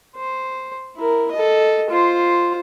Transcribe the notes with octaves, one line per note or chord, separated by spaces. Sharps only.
C5
E4 A#4
A4 D#5
F4 C5